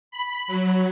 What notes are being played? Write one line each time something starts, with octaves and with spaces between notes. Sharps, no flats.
B5
F#3